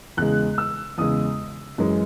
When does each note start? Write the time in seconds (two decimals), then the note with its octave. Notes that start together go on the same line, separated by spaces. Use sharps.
0.17 E2 C#3 G#3 F#6
0.58 E6
0.98 E2 C#3 G#3 D#6
1.78 F#2 E3 G#3 C#4